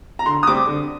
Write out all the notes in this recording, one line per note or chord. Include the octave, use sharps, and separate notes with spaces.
A#5
D3 C6
D#6
G3 C4 D6
D3